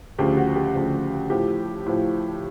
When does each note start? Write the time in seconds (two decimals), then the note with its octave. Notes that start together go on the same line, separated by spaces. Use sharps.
0.18 D2 C#3 F3 G4
0.37 F#4
0.55 G4
0.74 D2 C#3 F3
1.30 A2 F3 G4
1.86 A2 F3